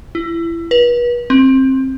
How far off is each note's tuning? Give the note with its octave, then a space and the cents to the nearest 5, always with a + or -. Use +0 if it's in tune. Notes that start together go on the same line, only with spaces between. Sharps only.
E4 +25
B4 -35
C4 +20